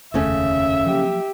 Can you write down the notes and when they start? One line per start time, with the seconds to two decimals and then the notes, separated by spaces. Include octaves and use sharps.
0.14 F1 D#2 C#3 A3 C#4 E5
0.86 F3 F#3 A#3 G4